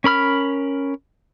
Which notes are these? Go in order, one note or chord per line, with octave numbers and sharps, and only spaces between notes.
C#4 A#4 B5 F6